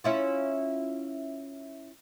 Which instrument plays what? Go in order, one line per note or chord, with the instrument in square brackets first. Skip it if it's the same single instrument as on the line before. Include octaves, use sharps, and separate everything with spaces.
[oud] C#4 E4 F4